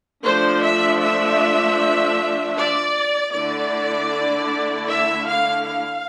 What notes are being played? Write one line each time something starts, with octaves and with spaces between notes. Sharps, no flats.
F3 A3 D4 C5
E5
E5
D5
D3 A3 E4 D5
E5
F5
F5